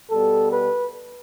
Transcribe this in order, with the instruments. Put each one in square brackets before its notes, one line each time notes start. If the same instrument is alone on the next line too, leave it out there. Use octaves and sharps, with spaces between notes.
[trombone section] B2 G3 B3 A4
B4